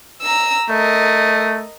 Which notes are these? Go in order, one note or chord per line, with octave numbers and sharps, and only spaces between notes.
A#5 E6
A3 A#4 D#5